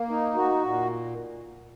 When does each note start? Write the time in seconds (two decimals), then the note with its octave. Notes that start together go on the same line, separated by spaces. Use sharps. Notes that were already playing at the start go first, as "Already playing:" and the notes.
Already playing: A#3
0.10 D#4
0.35 F#4
0.61 A#2